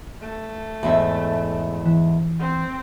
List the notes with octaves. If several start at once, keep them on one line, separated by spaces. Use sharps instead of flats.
A3
E2 G#2 E5
E3
C4